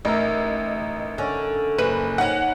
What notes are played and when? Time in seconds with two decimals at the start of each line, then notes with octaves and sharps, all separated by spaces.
0.05 A1 D#4 A#4 E5
1.18 D3 C#4
1.78 F#1 B4
2.18 C#4 D#4 F#5